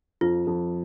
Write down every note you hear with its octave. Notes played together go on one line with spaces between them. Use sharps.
F2 F4
F2